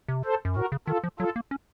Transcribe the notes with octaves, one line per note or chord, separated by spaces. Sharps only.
C3
A4 C5
F#2
A2 F#4 A#4
C#3
D#3 F4 A4
F3
F#3 F4 A4
A#3
C#4